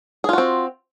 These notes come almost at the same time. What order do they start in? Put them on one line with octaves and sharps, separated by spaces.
G#4 F4 F#4 C4